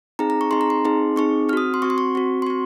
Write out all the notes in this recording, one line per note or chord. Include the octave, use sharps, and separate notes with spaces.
C4 D#4 G#4 A#5
A#5
C#6
C4 D#4 G#4 C6
A#5
C6
C4 D#4 G#4
C4 D#4 G#4 C#6
C4 F#4 D#6 F6
C6
C4 F#4 C#6
C6
C#6
C4 F#4
C6
C4 F#4 C#6